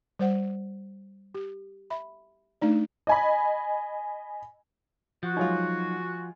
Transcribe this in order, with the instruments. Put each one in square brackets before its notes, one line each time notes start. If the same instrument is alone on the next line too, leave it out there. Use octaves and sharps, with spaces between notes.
[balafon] G3 C5 F#5
G4
E5 B5
A3 D4 D#4 D5
[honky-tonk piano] D#5 G#5 B5
[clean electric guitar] F3 [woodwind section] F#4
[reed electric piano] F#3 D#4 [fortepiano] G#3 F4